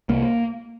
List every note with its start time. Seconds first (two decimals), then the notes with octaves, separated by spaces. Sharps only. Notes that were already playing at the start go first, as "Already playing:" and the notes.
0.09 C2 A#3